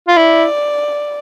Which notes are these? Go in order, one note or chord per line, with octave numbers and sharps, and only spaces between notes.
F4
E4 D5